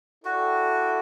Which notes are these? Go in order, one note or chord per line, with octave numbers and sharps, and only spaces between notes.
E4 F#4 A4 D5 G5